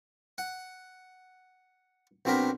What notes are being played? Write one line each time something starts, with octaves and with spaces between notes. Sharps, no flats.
F#5
B1 F#3 C4 D4 A#4 B5